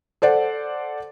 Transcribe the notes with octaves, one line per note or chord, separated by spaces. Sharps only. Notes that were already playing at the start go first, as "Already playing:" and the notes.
A4 C5 D5 F#5